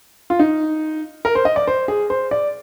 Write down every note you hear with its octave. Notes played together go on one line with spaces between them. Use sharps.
F4
D#4
A#4
C5
D#5
D5
C5
G#4
C5
D5